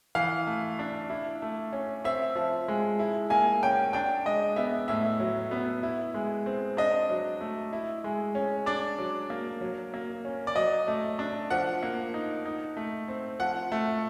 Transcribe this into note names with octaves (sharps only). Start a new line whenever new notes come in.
E3 F5
A3
D4
E4
A3
C#4
C4 E5
F3
G#3
E4
A#3 G#5
C#4 G5
D4 G5
G#3 D#5
B3 E5
A2 E5
F#3
B3
E4
G#3
C4
D4 D#5
F#3
A3
E4
G#3
C#4
D4 D5
F#3
A#3
F#3
A#3
C#4
D5
F#3 D#5
A3
D4
F3 F#5
A#3
D#4
D#4
A3
C4
F3 F#5
A3